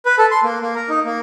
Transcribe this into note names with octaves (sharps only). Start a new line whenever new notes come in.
B4
A4
C6
A#3
A#3
A#4
D#4
A#3